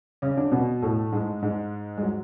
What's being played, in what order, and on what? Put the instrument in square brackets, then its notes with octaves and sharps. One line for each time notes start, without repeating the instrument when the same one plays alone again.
[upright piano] C#3 C#4
D3 D4
B2 B3
A2 A3
G#2 G#3
G#2 G#3
G#3
F#3